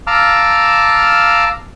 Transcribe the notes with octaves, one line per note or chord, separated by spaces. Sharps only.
F5 A5 A#5 D6 E6 F6